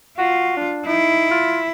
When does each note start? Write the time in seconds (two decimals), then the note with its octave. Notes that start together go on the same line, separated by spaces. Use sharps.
0.18 F4 F#4
0.57 D4
0.87 D#4 E4
1.31 F4